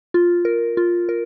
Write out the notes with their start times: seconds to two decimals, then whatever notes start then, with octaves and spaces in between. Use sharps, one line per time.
0.14 F4
0.45 A#4
0.77 F4
1.09 A#4